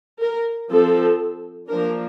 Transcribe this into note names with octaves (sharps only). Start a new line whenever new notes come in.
A#4
F3 C4 A4
F3 A#3 D4 A#4